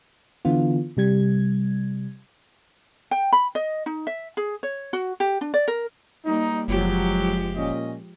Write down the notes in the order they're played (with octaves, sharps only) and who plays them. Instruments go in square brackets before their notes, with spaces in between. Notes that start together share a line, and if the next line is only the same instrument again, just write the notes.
[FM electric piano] D3 E3 B3 F4
C3 G3 G#6
[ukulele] G5
B5
D#5
D#4
E5
G#4
C#5
F#4
G4
D4
D5
A#4
[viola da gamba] G3 A#3 [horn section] D#4
[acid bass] F#1 [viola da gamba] F3 G#3 G4 [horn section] F#3
[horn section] A#2 C#4 D#5